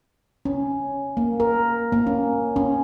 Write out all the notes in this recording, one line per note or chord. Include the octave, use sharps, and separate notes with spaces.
C#4
A#3
A#4
A#3
C#4
C#4